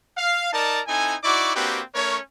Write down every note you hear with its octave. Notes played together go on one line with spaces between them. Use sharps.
F5
D#4 A#4 D5 A5
C4 D#4 E4 A4 G#5
D#4 E4 F#4 D5 C#6 D6
A#3 C4 D4 F#4 G4 B4
A3 C#4 A#4 C#5